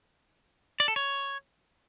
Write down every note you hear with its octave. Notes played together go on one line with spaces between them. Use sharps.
D5
A4
C#5